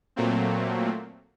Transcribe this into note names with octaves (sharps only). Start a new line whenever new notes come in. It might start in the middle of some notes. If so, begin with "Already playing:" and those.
A#2 F#3 A3 A#3 C4